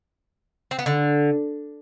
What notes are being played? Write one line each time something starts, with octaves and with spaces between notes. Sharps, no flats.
C4
B3
D3